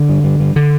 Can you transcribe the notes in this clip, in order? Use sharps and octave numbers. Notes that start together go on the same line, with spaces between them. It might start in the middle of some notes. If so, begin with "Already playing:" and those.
Already playing: D3
G2
G2
G2
D3